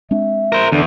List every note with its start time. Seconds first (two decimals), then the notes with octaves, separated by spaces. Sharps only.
0.11 G#3 C4 D4 E5
0.52 A#4 C5
0.72 E2 D3 D4